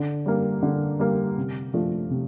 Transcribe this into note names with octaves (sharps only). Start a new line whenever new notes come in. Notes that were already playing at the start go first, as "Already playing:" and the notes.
Already playing: D3
G3 A#3
D3
G3 A#3
C3
F3 A3 D4 F4
C3